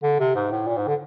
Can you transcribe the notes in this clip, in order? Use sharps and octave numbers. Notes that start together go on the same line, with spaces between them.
D3
C3
G#2
A2
A#2
G#2
D3